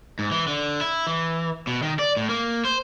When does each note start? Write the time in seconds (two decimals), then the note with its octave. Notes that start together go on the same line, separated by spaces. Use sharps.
0.19 G#2
0.31 E3
0.47 D3
0.81 E4
1.07 E3
1.67 B2
1.82 D#3
1.99 D5
2.17 A2
2.29 A#3
2.65 C5